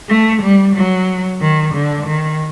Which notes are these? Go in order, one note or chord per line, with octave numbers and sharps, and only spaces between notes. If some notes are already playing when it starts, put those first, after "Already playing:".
A3
G3
F#3
D#3
D3
D#3